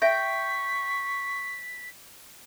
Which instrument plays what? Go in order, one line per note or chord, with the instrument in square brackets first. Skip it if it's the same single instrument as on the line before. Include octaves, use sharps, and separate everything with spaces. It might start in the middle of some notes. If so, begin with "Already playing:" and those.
[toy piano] E5 [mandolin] G5 [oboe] C#6 [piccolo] B6